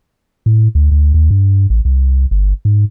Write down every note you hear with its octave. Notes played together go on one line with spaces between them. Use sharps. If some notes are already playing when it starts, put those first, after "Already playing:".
A2
D2
D2
D#2
G2
A1
C2
G1
G#2